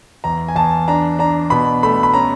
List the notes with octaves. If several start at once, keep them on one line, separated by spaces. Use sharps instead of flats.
E2 A#5
G#5
E2 A5
D4 A#5
D4 A#5
B2 B5
A3 B5
B5
C#4 A#5